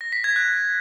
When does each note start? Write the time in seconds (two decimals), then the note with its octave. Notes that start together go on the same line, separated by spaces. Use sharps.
0.01 A#6
0.12 B6
0.24 G#6
0.36 F#6